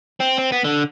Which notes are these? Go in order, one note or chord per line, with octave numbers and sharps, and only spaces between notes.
C4
C4
B3
D3